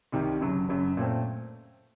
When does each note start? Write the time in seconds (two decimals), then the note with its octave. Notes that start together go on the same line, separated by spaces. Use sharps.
0.12 C2 C3 D#3
0.40 F#1 F#2 F#3
0.68 F#1 F#2 F#3
0.97 A#2 A3 C4